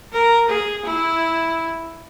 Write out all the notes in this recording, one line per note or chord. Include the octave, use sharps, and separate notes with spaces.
A#4
G#4
E4